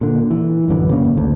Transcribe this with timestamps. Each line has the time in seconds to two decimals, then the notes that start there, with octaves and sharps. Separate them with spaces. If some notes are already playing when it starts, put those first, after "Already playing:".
0.01 A#2 D3
0.30 E3
0.68 A1 F#2 D3 E3
0.89 C#3 A#3
1.05 G#1
1.17 D2